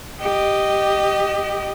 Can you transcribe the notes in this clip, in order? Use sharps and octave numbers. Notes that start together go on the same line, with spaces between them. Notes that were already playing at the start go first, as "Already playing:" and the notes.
G4 D#5